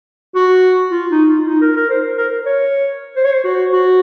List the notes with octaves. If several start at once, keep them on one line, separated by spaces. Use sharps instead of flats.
F#4
F4
D#4
F4
F4
D#4
A#4
A#4
C5
A#4
C#5
C5
C#5
C5
F#4
F#4